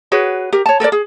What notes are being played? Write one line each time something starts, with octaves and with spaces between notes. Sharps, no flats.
F#4 G#4 B4 C#5
G4 A#4
C#5 A5
A4 A#4 C5 D5
G#4